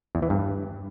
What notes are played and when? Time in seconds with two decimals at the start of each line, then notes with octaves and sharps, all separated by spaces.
0.15 E2
0.22 E3
0.30 G2